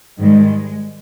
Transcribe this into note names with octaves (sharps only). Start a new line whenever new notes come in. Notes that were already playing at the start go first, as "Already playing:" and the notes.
G#2 D#3 G3 G#3